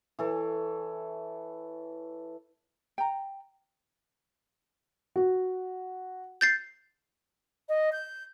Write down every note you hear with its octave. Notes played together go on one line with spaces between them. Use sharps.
E3 A4 C#5
G5 A#5
F#4
G6 A6 C7
D#5
G6